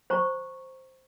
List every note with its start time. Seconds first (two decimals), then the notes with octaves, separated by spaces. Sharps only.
0.10 C5 A#5 C#6